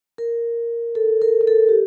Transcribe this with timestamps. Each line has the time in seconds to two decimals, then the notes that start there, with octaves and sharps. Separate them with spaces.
0.18 A#4
0.95 A4
1.22 A#4
1.41 A#4
1.47 A4
1.69 G4